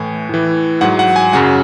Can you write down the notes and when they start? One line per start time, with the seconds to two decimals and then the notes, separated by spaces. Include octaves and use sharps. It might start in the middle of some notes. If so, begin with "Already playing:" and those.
Already playing: A2 E3 G#5
0.29 A2 E3
0.81 G#2 F#3 F#5
0.99 F#5
1.16 G#5
1.33 F#2 C#3 F#3 F#5